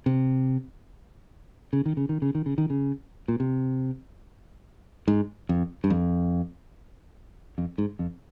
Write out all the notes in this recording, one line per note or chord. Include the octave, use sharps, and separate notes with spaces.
C3
C#3
D#3
C#3
D#3
C#3
D#3
C#3
D#3
C#3
A#2
C3
G#2
F2
G2
F2
F2
G#2
F2